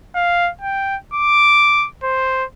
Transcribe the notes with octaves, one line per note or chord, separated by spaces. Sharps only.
F5
G5
D6
C5